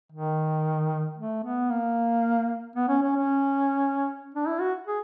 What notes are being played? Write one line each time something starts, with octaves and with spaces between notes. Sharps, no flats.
D#3
A3
B3
A#3
B3
C#4
C#4
C#4
D4
E4
F#4
G#4